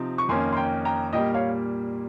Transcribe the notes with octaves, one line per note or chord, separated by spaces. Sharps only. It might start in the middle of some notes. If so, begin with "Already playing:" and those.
Already playing: C3 F3 C4 D#4
C#6
F2 D#3 A#3 C#4 G#5 C6
C6
G5 A#5
G5 A#5
A#2 G3 A#3 D#5 G5
C#5 F5